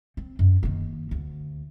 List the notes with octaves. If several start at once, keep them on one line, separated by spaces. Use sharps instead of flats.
C4
F#2
D#3 A#3
D2